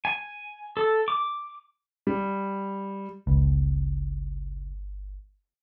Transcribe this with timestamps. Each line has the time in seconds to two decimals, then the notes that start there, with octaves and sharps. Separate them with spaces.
0.05 G#5
0.77 A4
1.08 D6
2.07 G3
3.27 G1 C#2